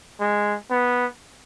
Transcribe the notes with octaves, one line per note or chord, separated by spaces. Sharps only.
G#3
B3